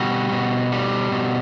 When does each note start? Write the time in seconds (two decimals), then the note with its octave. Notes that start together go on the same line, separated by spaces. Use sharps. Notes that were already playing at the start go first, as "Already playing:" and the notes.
Already playing: B2 G3 F#4
0.32 B2
0.72 G3
1.12 B2